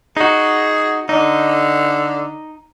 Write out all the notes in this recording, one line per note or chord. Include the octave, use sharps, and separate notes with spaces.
D#4 F#4 G#4
D3 D#4